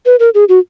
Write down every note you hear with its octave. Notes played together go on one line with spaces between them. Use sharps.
B4
A#4
G#4
F#4